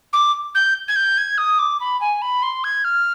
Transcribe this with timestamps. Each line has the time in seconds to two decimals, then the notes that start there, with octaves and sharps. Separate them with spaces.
0.13 D6
0.55 G6
0.88 G#6
0.96 G6
1.18 G#6
1.38 D#6
1.59 D6
1.80 B5
2.01 G#5
2.22 B5
2.43 C6
2.64 G#6
2.84 F6